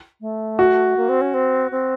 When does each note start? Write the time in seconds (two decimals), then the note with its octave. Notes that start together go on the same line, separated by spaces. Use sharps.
0.21 A3
0.59 F#4
0.97 A#3
1.09 C4
1.21 C#4
1.34 C4
1.71 C4